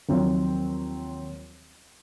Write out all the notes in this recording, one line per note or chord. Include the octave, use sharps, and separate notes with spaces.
D#2 F3 F#3 C4